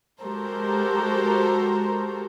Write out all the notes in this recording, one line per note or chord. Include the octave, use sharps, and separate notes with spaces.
G#3 F#4 G4 A4 A#4 C5